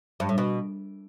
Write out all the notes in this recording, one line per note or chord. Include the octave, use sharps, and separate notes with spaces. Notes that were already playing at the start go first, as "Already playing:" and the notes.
G2
A2
B2